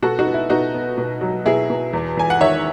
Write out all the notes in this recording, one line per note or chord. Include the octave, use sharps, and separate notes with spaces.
B2 F#4 A4
D#4 F#4
B3
E4
B2 D#4 F#4
B3
B2
F#3
B2 E4 G#4
B2
E2
E2 G#5
F#5
D#3 C#5 E5